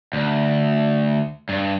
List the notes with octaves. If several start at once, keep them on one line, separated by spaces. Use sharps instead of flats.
D2
G2